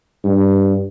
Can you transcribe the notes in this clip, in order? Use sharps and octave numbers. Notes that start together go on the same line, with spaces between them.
G2